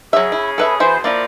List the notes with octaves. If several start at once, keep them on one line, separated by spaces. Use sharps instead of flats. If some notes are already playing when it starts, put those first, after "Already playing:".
C#3 F#3 C#4 G#4 E5
E4
A4 B4 E5
B2 E3 G#4 C5 B5
F3 A#3 E4 F4 A#4 D5